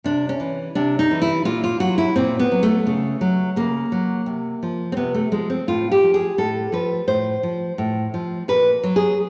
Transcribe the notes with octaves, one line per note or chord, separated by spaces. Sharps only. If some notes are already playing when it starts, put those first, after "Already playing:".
C3 D4
C#4
E3
C3 D4
D#4
E3
E4
A#2 F4
F4
F#3 F#4
E4
A#2 C4
B3
F#3
A3
C#3
F#3
C#3 A#3
F#3
C3
F3
C4
C3 B3
A3
F3 G#3
C4
A2 F4
G4
F3
G#4
A2 A4
F3 B4
A2 C5
F3
A2
F3
A#2 B4
F#3
G#4